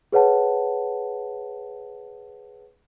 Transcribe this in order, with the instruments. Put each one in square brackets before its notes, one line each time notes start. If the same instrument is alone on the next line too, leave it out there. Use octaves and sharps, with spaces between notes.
[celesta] G#4 B4 C#5 F#5 A5